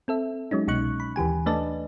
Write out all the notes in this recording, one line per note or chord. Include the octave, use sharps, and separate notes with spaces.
C4 A4 E5
F#3 G#3 C#4 D#4
C2 B2 D#4 C#6 F#6
B5
D#2 E3 G4 G#5
A3 D4 B4 D5 D#5 A5